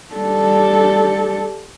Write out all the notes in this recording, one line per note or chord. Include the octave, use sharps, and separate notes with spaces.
G3 A4